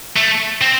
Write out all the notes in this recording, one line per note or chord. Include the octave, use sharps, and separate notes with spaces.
A3
C4